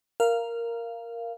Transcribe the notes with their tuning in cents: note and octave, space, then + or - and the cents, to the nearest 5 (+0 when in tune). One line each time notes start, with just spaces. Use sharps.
A#4 +0 F5 -15